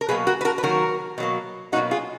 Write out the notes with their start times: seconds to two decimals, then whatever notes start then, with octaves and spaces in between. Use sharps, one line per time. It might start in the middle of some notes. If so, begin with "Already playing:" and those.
0.01 A#4
0.08 B2 F#3 A#3 G#4 B4
0.27 F#4 A#4
0.41 B4
0.45 F#4 A#4
0.58 B4
0.63 D#3 F#3 A#3 F#4 A#4
1.18 B2 F#3 A#3
1.72 B2 F#3 A#3 D#4 F#4
1.91 F4 G#4